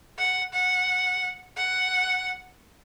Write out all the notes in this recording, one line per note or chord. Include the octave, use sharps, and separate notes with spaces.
F#5
F#5
F#5